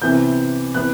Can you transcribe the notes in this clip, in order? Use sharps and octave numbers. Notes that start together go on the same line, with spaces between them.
C3 E3 B3 G6
C3 E3 B3 F#6